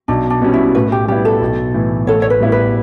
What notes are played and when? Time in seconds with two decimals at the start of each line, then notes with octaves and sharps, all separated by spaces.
0.08 B1 D4
0.30 D4
0.42 B2 G3 C#4
0.54 E4
0.75 A2 B4
0.92 G4
1.08 G3 B3 E4 G4
1.25 A4
1.42 B1
1.74 A2 E3
2.07 A1 A4 C#5
2.22 C#5
2.30 B4
2.40 A2 G3 B3 E4
2.52 B4